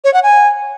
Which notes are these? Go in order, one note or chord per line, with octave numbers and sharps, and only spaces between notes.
C#5
F#5
G#5